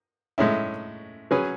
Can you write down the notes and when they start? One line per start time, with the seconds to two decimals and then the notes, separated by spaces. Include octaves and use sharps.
0.38 A2 G#3 C#4 E4
1.31 F#3 C#4 G#4 B4